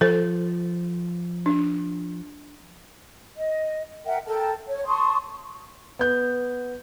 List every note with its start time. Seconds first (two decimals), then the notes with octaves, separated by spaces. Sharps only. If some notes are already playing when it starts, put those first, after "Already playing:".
0.01 F3 A4 C5
1.46 D4
3.36 D#5
4.05 A#4 E5 F#5 G5
4.25 A4 A#4 G5 A5
4.68 C#5
4.87 A5 C6 C#6 D#6
5.99 B3 G6